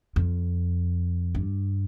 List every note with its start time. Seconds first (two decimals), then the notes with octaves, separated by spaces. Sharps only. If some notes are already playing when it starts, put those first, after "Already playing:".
0.16 F2
1.35 G2